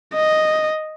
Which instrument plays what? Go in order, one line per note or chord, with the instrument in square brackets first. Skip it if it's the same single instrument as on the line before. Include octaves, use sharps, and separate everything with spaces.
[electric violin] D#5